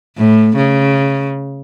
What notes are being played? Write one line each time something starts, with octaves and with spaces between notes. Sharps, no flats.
A2
C#3